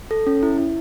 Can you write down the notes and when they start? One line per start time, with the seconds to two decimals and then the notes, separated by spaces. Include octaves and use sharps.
0.11 A4
0.27 C#4
0.43 E4
0.58 E4